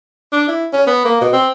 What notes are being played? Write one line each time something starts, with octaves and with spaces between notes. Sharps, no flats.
D4
E4
C#4
B3
A#3
B2
C4